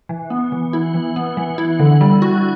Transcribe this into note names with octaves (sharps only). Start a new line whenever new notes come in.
E3
B3
E3
E4
E3
B3
E3
E4
D3
G3
F#4